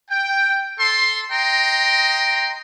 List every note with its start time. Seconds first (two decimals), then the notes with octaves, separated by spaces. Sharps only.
0.11 G5
0.80 A4 C6
1.31 D#5 G5 A#5 C6